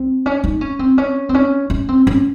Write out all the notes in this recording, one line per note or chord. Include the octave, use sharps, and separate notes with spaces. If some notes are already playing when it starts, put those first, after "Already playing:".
Already playing: C4
C#4
D#4
C#4
C4
C#4
C4
C#4
C#4
C4
C#4